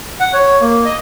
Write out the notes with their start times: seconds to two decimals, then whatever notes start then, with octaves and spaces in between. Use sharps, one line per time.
0.20 F#5
0.33 C#5
0.61 A#3
0.85 D#5